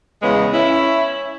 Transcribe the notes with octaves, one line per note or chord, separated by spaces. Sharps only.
E2 C#3 G#3 B3
C#4 E4